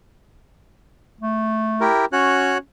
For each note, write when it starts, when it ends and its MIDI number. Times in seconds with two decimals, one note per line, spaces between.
1.20 1.87 57
1.81 2.05 64
1.81 2.05 67
1.81 2.05 70
2.13 2.58 61
2.13 2.58 66
2.13 2.58 73
2.13 2.58 90